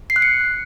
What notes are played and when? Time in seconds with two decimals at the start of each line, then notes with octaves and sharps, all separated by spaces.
0.10 C7
0.16 F#6
0.22 C#7